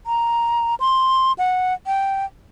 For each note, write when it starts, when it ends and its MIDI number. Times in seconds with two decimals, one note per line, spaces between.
0.06 0.75 82
0.80 1.32 84
1.38 1.74 78
1.87 2.25 79